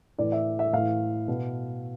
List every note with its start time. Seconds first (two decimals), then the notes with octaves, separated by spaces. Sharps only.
0.18 A2 E3 D5
0.32 E5
0.59 E5
0.73 A2 E3 F5
1.28 B2